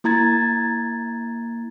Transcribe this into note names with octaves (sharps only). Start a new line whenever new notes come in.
A#3 E4 A#5 G#6 A6